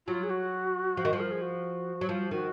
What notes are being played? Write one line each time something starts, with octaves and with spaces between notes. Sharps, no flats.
F#3 F4
G#4
F#4
F3
D#3
F3
A#4
G#4
F#4
F#3
F3
D#3 F#4